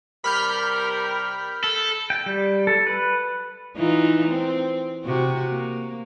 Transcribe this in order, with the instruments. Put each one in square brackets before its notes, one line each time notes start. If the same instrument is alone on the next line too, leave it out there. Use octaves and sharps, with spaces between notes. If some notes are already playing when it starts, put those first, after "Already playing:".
[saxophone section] C3 G3 A#4 [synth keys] B5 F6 G6
[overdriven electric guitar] A4
[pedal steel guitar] G5
G3
A4
B4
[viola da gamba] E3 D#4 F4
C4
C3 F#4
A#3